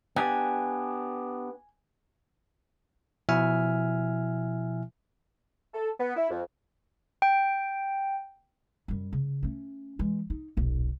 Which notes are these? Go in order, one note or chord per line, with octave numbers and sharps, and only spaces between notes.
B3 D4 G4 G#5
B2 F3 E4 E5 G#5 F6
A4
B3
E4
F2
G5
F#2 G3
C#3
A3 C#4
E3 G#3
D#4
D#1 B1